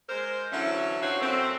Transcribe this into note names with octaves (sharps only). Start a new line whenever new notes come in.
G#3 A#4 C5
D3 E3 F#3 C#4 E4
C4 F4 F#4 C#5
F#2 A3 C4